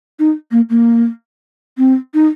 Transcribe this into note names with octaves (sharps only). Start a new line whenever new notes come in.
D#4
A#3
A#3
C4
D#4